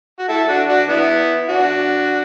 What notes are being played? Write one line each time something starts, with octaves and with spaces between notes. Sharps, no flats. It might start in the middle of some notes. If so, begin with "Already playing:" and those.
F#4
E4 A4
D4 F#4
D4 F#4
B3 E4
D4 F#4